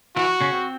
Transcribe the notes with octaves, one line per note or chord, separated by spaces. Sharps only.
E3 E4 F#4
C#3 C#4
C4